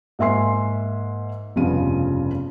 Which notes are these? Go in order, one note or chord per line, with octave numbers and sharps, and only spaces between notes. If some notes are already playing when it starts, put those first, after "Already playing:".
G#2 A#3 E5 G#5 C6 C7
F1 G2 C#3 F3 B3 D#7